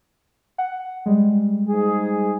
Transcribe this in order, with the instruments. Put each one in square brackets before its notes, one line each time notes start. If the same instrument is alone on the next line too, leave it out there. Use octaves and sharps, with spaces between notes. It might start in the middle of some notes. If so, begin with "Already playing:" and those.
[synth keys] F#5
G3 G#3
[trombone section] G#2 G#4